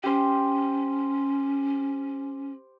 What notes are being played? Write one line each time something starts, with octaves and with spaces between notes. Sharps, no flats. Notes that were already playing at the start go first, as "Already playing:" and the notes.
C#4 G4 C5